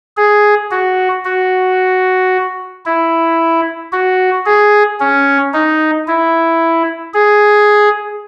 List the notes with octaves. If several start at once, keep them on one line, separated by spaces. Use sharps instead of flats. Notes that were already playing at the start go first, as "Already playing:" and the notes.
G#4
F#4
F#4
E4
F#4
G#4
C#4
D#4
E4
G#4